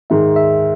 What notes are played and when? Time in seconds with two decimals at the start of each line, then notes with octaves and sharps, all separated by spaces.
0.10 G#2 D#3 G#3 E5
0.36 E5